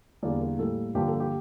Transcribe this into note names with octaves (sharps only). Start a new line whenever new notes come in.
E2 D3 G3 A#3 D5
A#4
A2 G3 A#3 A4
G2 D3 F3 A#3 G4
A4
G4